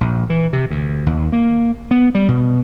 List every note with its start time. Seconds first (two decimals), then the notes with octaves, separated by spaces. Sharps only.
0.01 A#1
0.30 E3
0.53 C3
0.70 D2
1.06 D#2
1.32 A#3
1.91 B3
2.15 G3
2.28 B2